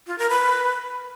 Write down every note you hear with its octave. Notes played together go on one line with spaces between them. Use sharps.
F4
A#4
B4